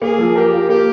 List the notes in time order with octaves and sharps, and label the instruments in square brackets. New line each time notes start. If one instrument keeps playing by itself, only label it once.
[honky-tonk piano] A#3 [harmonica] G#4
[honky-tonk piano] F3
[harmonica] G4 [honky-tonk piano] A#4
[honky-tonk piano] F4
[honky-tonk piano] A#3 [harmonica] G4